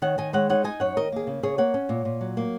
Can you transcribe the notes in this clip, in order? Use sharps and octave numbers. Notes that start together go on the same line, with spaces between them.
D#3 C#5 F#5
D#3 D#5 G#5
G#3 C#5 F#5
D#4 C#5 F#5
D#4 D#5 G#5
F#2 C#5 F#5
D#3 A#4 D#5
A#3 G#4
C#3
C#3 G#4 C#5
A#3 C#5 F#5
C#4
A#2
A#2
F#3
A#3